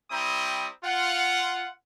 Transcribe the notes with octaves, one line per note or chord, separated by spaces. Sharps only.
G3 C4 E4 G5 A#5 D#6
F4 F#5